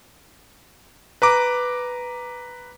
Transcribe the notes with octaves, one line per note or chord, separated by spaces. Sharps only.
B4 A#5 D6